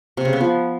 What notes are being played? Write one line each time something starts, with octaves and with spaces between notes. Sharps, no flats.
C3
C#3
B3
F3